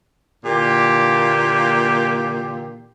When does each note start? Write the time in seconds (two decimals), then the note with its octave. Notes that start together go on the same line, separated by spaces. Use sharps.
0.45 A#2 D3 E3 A#3 G4